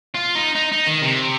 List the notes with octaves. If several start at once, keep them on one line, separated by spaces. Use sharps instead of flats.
F4
D#4
D#4
D#4
D#3
C3